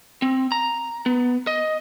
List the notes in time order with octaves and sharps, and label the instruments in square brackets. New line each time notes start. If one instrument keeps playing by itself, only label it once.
[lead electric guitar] C4
A#5
B3
D#5